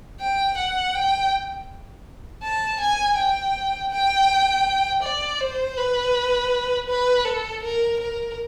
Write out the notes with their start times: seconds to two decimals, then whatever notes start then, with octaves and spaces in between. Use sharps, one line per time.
0.21 G5
0.58 F#5
0.95 G5
2.43 A5
2.81 G#5
3.18 G5
3.92 G5
5.04 D5
5.40 C5
5.77 B4
6.89 B4
7.26 A4
7.63 A#4
8.00 A#4